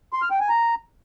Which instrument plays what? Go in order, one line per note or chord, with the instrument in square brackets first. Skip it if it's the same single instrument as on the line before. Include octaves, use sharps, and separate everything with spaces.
[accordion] C6
F6
G5
G#5
A#5